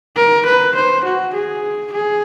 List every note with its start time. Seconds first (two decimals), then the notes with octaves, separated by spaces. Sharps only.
0.16 A#4
0.46 B4
0.75 C5
1.04 F#4
1.34 G#4
1.93 G#4